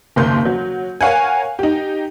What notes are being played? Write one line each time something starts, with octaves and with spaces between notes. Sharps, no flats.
F#1 D#2 A#3 C6 G6
F#3
A#4 C#5 F5 F#5 G#5
D#4 G4